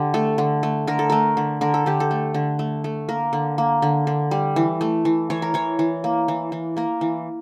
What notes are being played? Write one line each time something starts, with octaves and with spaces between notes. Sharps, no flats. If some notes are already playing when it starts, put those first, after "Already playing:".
Already playing: D3 G4
A3 A4
D3
A3
D3 A#4
A4
A3 A#4
D3
D3 A#4
A4
D3 G4
A4
A3
D3
A3
A3
A#3 A#4
D3
A#3
D3
D3
G3
E3
A3
E3
E3 C#5
A#4
E3 C#5
E3
A#3
E3
E3
A#3 A#4
E3